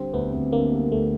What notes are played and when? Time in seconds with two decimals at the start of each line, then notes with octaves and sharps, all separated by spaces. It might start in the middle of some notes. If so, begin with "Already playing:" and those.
Already playing: D3 G3 C4
0.13 D2 B3
0.33 D2
0.53 D3 A#3
0.72 G3
0.92 D2 A3